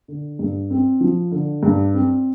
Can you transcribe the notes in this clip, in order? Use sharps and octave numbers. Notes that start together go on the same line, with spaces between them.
D3
G2
C4
F3
D3
G2
C4